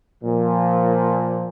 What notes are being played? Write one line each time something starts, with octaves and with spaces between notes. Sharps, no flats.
A#2 F3